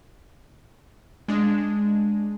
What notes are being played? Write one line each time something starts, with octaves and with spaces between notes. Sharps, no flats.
G#3 D4